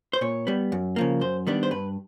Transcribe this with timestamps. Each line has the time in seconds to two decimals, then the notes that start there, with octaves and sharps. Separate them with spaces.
0.13 C5
0.21 A#2 C#5
0.47 G3 B3
0.72 F#2
0.96 C#3 F3 A#3
1.21 F#2 C5
1.47 D#3 G3 B3 D4
1.63 C5
1.71 G2 B4